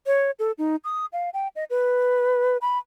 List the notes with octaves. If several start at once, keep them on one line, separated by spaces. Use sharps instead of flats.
C#5
A4
D#4
D#6
F5
G5
D#5
B4
B5